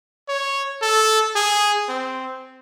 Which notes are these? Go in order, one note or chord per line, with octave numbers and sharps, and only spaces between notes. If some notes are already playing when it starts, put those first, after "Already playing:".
C#5
A4
G#4
C4